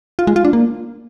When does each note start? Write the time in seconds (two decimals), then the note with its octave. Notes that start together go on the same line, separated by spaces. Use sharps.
0.19 F4
0.27 G#3
0.36 F4
0.45 D4
0.53 A#3